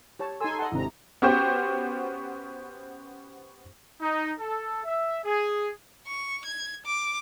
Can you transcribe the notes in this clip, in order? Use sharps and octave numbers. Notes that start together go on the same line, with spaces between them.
G4 C#5 A5
D#4 A4 G#5 C6 E6
A4 D#5 F#5 C6
G#1 C3 D4 E4 A#5
B3 C#4 F#4 G4 C5
D#4
A4
E5
G#4
C#6
G#6
D6